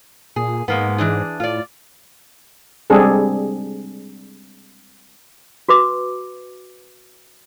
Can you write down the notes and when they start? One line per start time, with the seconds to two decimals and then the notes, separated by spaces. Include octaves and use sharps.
0.36 A#2 G#4
0.68 G#2 G#3 A#3 B3
0.98 E3 D4 G#4
1.40 A2 F4 D5
2.90 G3 G#3 C4 D4 G#4 A4
5.69 F#4 B4 D6